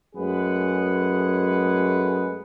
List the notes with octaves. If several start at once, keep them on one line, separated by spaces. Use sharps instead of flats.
F#2 G#3 A3 G#4 B4 F#5